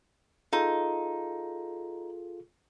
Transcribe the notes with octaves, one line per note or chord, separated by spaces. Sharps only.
D#4 F4 G#4 A4